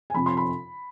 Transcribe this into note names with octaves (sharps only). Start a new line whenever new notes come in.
G#5
F2 C3 F3 C4 B5
C6
B5